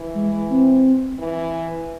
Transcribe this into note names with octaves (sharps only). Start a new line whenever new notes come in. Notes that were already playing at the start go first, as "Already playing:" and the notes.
Already playing: E3
G#3
C4
E3